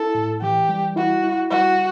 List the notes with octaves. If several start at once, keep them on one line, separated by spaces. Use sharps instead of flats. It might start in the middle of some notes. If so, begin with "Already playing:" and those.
Already playing: E4 A4
A2
E3 G4
G3
E4 F#4
E4
G3 F#4